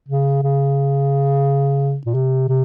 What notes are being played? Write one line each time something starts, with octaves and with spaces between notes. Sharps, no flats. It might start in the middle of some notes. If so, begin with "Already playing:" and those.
C#3
C#3
A#2
C3
C3